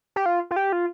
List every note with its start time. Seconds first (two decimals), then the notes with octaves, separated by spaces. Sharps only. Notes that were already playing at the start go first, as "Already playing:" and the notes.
0.16 G4
0.26 F4
0.51 F4
0.56 G4
0.73 F4